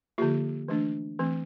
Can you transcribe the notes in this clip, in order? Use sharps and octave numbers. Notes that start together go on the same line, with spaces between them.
D3 F3 A#3 F4 G4
E3 A3 D4
E3 A3 C4